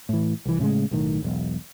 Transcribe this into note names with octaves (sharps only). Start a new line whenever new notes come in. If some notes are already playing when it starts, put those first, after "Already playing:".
A2 E3
C2 E3
A2 C#3 G3 G#3
B1 A2 D#3
E1 B1